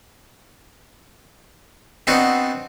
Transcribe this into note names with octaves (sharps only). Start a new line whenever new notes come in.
B3 C4 D4 D#4 F#4